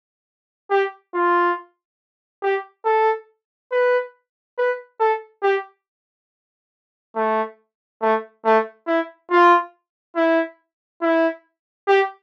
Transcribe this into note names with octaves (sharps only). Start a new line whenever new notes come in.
G4
F4
G4
A4
B4
B4
A4
G4
A3
A3
A3
E4
F4
E4
E4
G4